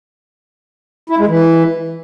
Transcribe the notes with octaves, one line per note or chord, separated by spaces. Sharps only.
E4
G#3
E3